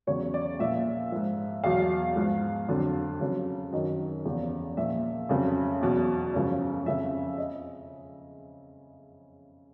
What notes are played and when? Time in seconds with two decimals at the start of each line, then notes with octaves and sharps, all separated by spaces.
0.07 E2 C#3 F#3 C#5
0.34 D5
0.59 A#2 F3 E5
1.12 G#2 F3
1.64 E2 B2 F#3 F5
2.16 G#2 F3
2.69 F2 D3 F#3
3.21 F2 C#3 F#3
3.73 F#2 D#3 F#3 D#5
4.25 E2 C#3 F3
4.77 A#2 F3 E5
5.29 F2 C#3 F#3
5.81 E2 B2 F#3
6.34 F#2 C#3 F3
6.86 F2 C#3 F3 E5
7.38 D#5